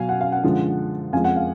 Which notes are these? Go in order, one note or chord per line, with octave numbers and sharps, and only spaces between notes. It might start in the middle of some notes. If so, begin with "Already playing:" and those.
Already playing: B2 F#3 F5 G#5
F#5
F5
F#5
F#2 D3 F3 G#3
F2 F3 G#3 F5 G#5
F#5
F5